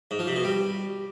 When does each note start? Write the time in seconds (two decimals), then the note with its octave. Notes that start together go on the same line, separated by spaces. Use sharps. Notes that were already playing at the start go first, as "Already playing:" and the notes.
0.11 G#2
0.19 F3
0.27 C3
0.36 B2
0.44 G3